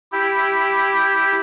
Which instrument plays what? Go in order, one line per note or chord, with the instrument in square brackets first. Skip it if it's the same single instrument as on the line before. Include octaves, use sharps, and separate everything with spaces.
[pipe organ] E4 G4